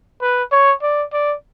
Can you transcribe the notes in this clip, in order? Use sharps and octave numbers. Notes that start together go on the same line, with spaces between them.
B4
C#5
D5
D5